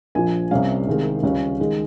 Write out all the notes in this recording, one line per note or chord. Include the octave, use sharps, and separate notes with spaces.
A#1 A#2 F3 G#5
C2 C3 G3 C#4 F5
C2 C3 D#3 G#3
C#2 C#3 G3 C#4
D#3 G#3 D#4